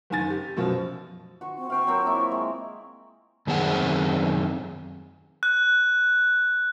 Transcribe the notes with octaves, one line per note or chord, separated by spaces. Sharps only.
F#1 D#3 G#5 A6
G4
F#2 B2 F3
F#4 C#6
C4
F5 G5 A5 C#6
F#3 C4 A#4
A#3 E4
G#3
F#2 D#3 C4 G#4 F#5
F#6